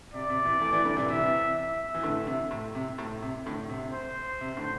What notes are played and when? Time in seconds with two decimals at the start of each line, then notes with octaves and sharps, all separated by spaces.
0.14 C3 D5
0.30 C3
0.45 C3 E3
0.61 E3 A3
0.73 E3 A3
0.85 D3 G3
0.97 C3 E3
1.08 C3 E3 E5
1.56 E5
1.94 E3
2.03 A2 D3
2.27 C3
2.51 A2
2.75 C3
2.98 A2
3.22 C3
3.45 A2 D3
3.69 C3
3.93 C5
4.41 C3
4.57 A2 D3